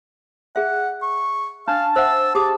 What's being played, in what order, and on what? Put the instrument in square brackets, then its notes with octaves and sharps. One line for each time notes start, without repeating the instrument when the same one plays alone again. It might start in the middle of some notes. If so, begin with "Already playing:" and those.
[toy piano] G#4 E5 [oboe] F#5
[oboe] C#6
[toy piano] C#4 D4 [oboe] F5 [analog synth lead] A5
[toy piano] C5 E5 F#5 [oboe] E6
[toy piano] G4 G#4 D#6 [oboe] D6